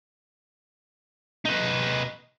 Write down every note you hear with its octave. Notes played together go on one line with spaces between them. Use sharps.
D#4 B4